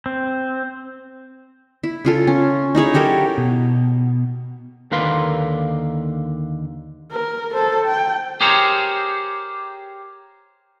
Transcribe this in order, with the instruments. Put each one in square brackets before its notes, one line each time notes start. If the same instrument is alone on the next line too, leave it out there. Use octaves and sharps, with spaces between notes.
[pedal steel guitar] C4
[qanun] E4
C#3 F4 A4
C#4
D#4 E4 G#4 C#5
F#3 G4 A4 A#4
[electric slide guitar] B2
[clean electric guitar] D#2 D3 A#3 B4 F5 C6
[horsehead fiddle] A#4
A4 C5
G5
[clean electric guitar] G4 G#4 A#4 C5 C#5